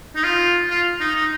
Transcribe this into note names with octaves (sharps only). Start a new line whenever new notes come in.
D#4
F4
F4
D#4
D#4